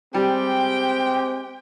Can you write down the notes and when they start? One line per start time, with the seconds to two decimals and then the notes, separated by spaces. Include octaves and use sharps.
0.14 G3 G#3 C4 G4 G5